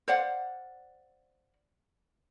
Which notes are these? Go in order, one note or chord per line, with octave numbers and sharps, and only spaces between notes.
C5 D5 F5 F#5